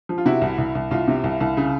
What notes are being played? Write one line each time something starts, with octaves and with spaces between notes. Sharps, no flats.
F3
F4
C3 E4 F#4
C2
C2
C2
C2 F4
C3
C2
C2
C#3